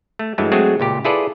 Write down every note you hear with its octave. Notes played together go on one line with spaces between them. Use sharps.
A3
G2 E3 F#3 G#3 A3
F#3 G#3 A3 C4 F#4 G#4
C#2 A#2 G4
E4 F4 G#4 A4 B4 D5